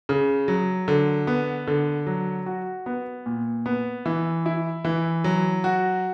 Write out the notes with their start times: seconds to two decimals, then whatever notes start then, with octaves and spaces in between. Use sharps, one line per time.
0.09 C#3
0.48 F#3
0.88 D3
1.27 B3
1.67 D3
2.07 F#3
2.46 F#4
2.86 B3
3.26 A#2
3.66 B3
4.06 E3
4.46 E4
4.85 E3
5.24 F#3
5.64 F#4